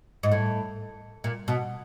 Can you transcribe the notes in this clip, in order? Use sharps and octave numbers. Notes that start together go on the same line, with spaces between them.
G#2
A2
A#2
B2